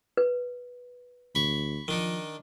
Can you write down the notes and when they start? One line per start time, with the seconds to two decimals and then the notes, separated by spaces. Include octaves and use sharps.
0.17 B4
1.35 D2 B5 C#6
1.88 D#3 F3 D4 D#4